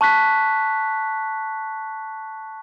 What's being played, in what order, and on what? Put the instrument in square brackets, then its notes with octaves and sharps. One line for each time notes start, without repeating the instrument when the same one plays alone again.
[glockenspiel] A5 C#6 F#6 B6